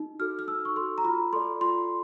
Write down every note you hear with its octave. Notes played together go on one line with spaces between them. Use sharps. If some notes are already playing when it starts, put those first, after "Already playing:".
Already playing: D#4
F#4 A4 F6
F6
D#4 E6
C#6
F#4 A4 C6
A#5
F4 B5
A4 D5 C6
F4 C6